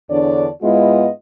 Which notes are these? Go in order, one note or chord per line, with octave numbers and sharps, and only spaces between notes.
E2 D3 D4 C#5 D5
G#2 G#3 B3 E4 F4 D#5